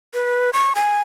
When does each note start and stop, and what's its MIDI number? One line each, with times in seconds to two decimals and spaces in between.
0.14 0.50 71
0.53 0.73 85
0.75 1.01 80